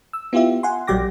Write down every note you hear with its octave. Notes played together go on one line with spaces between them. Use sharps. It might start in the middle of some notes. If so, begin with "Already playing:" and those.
E6
B3 E4 F4 G4 E5
F#5 G#5 C6
A#1 F#3 G3 G5 D6 A#6